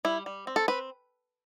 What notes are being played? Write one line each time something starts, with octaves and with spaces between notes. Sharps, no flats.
G3 E4
G3
C4
A4
C4 B4